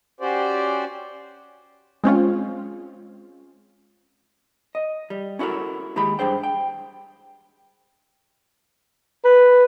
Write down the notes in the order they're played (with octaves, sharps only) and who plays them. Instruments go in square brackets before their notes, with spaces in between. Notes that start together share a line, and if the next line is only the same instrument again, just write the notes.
[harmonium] C#4 F#4 G4 C5 D5
[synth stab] G#3 C4 C#4 F4
[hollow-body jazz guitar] D#5
G3
C#4 E4 F#4 A4 A#4
D#2 G#3 G4 G#4 B5
G2 F#3 D4 G#4 C5 G5
G5
[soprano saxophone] B4